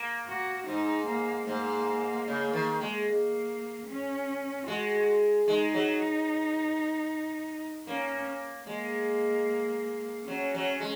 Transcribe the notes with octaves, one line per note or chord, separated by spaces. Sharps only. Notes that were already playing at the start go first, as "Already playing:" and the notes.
Already playing: A#3
F#4
G#2 D#4
A#3
G#2 A#3
C#3
D#3
G#3
A#3
C#4
G#3 F#4
G#3 D#4
F#3
A#3 C#4
G#3 A#3
F#3 C#4
F#3
G#3